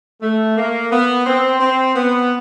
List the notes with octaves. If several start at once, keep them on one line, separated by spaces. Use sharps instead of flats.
A3
A#3
B3
C4
C4
B3